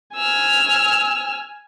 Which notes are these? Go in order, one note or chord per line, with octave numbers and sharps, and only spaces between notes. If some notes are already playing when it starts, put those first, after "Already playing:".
G#5 E6 F6